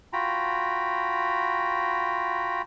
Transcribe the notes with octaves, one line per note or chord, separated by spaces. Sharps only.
F4 F#4 G5 A#5 B5